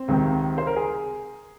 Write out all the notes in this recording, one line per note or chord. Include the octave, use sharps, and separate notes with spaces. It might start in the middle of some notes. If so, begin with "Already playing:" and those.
Already playing: C4
C#2 C3 D#3
C5
A#4
G#4